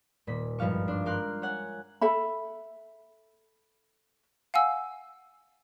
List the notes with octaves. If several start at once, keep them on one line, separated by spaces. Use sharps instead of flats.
D#1 A#2 B6
G#1 G2 F3 F5 C#6
D4 C6
A#4 F5 C6 F#6 G6
C#5 F#5 G#5
A4 E5 B5
F5 F#5 G#5 E6